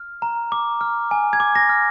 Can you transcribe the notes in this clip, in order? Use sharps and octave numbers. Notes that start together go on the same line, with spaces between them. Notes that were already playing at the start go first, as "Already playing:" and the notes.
Already playing: F6
A#5
D6
F6
G#5
G#6
D6
A#6
F6